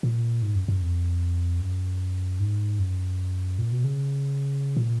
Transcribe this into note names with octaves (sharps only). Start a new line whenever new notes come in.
A#2
G#2
F#2
F#2
F2
F#2
G#2
F#2
A#2
B2
C#3
A#2